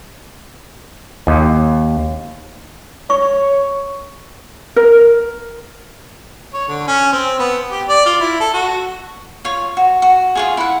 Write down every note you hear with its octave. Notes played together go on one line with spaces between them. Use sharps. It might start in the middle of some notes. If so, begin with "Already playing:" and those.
D#2
C#5 C#6
A#4
C#5
D3
C#4
C4
B3
G4
D5
F4
E4
A4
F#4
F4 C#5
F#4
F#4
F4 F#4 G#4
E4 F#5